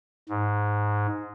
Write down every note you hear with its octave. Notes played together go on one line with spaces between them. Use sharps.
G#2